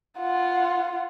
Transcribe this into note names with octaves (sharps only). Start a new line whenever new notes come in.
F4 F#5